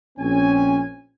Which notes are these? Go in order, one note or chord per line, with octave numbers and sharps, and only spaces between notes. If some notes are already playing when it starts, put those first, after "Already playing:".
A#1 C4 C#4 G#5